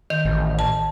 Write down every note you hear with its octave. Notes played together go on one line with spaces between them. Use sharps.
D#3 G6
A1
A5